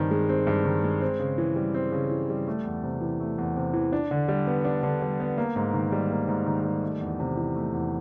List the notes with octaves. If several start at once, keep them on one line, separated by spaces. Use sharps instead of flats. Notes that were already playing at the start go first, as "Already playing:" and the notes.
Already playing: G2 D#3 C4
G#3
C4
G2
D#3
G#3
C4
C#3
E3
G3
C4
C#3
E3
G3
A3
E2
C3
E3
A3
E2
C3
E3
D4
D3
G3
B3
D4
D3
G3
B3
A#3
G#2
D#3
G3
A#3
G#2
D#3
G3
A3
E2
C3
E3
A3
E2